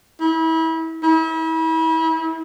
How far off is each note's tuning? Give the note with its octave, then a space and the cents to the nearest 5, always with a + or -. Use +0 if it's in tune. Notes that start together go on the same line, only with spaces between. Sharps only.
E4 -35
E4 -35